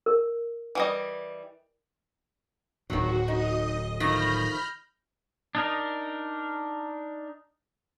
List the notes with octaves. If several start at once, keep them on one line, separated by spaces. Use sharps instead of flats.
A#4
E3 G3 D#5
D1 D2 A2 D#3 F#3 F#4
D#4 D#5 D#6
D#3 F3 A3 B5 F6 G6 A#6
D4 D#4 A#4